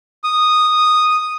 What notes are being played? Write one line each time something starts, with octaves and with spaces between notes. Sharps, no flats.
D#6